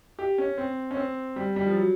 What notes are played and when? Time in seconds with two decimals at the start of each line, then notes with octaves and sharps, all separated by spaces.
0.19 G4
0.38 C#4
0.58 C4
0.91 C#4
0.97 C4
1.36 G3
1.56 G3
1.66 F3
1.76 F#3